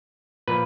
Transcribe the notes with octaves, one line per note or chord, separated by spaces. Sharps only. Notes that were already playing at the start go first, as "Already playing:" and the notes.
A#2 F3 B4